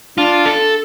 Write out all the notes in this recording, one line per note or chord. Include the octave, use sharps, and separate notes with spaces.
D4 F4
A4